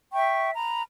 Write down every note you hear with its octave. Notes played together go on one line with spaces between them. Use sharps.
E5 G5 C#6
A#5 B5